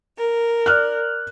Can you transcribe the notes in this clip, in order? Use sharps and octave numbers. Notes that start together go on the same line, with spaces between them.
A#4
D5 F6 F#6